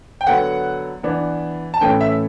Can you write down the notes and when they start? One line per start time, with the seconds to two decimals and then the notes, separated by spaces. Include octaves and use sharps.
0.21 G5
0.27 D3 F#3 B3 F#5
1.03 E3 B3 D4
1.74 A5
1.81 A2 E3 A3 C#4 G5
2.01 E5